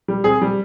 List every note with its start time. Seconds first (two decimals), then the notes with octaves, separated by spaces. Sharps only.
0.08 G3
0.24 C4 G#4
0.42 G3